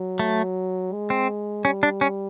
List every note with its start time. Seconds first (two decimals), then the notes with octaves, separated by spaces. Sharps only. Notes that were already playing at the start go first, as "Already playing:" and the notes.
Already playing: F#3
0.19 A3
0.93 G#3
1.10 C4
1.65 G3 C#4
1.83 D4
2.01 C#4